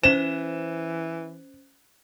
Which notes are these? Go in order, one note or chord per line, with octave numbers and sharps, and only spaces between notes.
E3 C#4 C5 E7